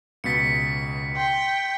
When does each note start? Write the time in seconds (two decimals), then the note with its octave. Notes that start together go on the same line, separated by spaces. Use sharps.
0.24 C#2 B2 A6 B6 C#7
1.16 G5 C6 C7